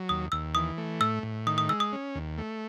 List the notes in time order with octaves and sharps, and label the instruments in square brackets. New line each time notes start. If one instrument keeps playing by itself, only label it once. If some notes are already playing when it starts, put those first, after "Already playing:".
Already playing: [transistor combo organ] F#3
[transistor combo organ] D#2 [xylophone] D#6
[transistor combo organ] D#2 [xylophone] E6
[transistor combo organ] E3 [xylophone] D#6
[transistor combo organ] A3
[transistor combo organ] A2 [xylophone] E6
[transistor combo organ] A2
[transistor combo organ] D#3 [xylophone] D#6
[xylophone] D#6
[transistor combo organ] G#3 [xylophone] E6
[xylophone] D#6
[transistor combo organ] C#4
D#2
A3